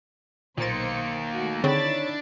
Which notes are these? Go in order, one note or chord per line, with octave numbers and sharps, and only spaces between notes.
B1 A#2 D#3 A#3 C5 A6 C#7
A3 F#4
D3 D#3 C4 D4 E4 G#4 C#5 A6